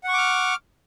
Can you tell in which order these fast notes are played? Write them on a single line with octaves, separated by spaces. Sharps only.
F#5 C#6 D6 F6